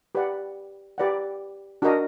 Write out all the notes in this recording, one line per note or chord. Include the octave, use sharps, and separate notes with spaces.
G4 B4 D5 F#5
G4 B4 D5 F#5
D4 F#4 A#4 D#5